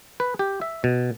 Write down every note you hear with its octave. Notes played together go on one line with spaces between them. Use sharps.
B4
G4
E5
B2